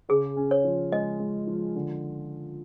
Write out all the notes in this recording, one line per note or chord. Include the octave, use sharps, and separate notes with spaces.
C#3 G#4
C#4
C#5
F3
G#3 D#5
G#3
F3
D3